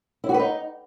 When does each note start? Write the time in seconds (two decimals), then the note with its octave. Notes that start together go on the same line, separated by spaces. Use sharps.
0.24 E4
0.29 F#4
0.34 B4
0.39 D#4